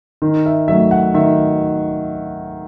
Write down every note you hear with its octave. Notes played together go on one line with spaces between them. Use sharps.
D#3
E5
F#3 A3 E5
F#5
D#3 E5